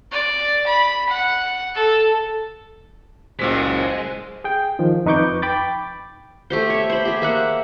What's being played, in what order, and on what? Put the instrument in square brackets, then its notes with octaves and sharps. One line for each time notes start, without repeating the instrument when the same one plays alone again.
[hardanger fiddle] D5
B5
F#5
A4
[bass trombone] F#1 [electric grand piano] C#2 A#2 B6 [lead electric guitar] G#3 [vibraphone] C5
[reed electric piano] G#4 G5
D#3 F3
F2 D#4 B4 C#6 D6 G6
G5 B5 D6 G6 A6
[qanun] A3 G4 C5
C#5 E5
C5 B5
G4 G#4
A#3 E5 F#5